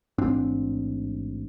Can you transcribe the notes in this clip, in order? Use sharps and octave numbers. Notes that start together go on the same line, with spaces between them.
A1 G#2 C4 D4